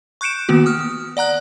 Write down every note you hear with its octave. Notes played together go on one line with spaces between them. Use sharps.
C#6 F#6 G6 C#7 D7 E7
D#3 A#3 B3 F#4
D#6 F6
D#6
D5 F#5 A#5 F#6